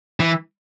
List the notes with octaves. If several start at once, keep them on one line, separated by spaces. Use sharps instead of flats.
E3